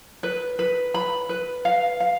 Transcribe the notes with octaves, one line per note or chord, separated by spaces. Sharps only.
B4
B4
B5
B4
F5
F5